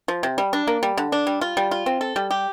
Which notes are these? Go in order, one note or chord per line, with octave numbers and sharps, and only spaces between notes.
F3
C3
G3
D4
A#3
G3
D3
D4
G3
F4
G3
F4
C4
A4
G3
G4